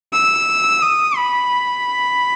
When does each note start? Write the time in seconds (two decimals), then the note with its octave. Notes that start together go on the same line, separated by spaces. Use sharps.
0.13 E6
0.83 D#6
1.17 B5